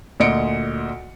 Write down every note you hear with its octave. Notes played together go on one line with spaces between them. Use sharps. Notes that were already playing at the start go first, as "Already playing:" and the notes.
D2 A#2 D#5 C#7 D7